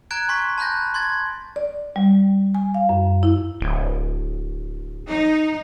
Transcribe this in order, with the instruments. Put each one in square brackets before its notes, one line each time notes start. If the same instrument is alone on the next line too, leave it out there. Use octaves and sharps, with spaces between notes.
[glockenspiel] A#5 F#6 G#6 D7
G#5 C6 C#6 B6
A5 B5 F#6 G6 A#6
C6 G#6 A6
[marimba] D5
G3
G#5
F5
F#2
E4
[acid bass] D1
[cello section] D#4